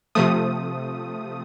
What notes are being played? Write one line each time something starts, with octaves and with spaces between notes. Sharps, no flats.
C3 F3 A3 D#6